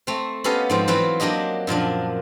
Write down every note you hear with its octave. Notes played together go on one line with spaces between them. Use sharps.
A3 C4
B3 C#4 G4 A4 D#5 F5
G#2 F3 C4
E3 F#3 C4 F4 B4
F#3 A#3 D4 G4 D#5
F#2 A#2 F3 D4